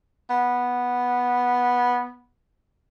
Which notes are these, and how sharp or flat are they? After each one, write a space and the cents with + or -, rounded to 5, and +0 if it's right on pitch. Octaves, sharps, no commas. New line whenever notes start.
B3 -10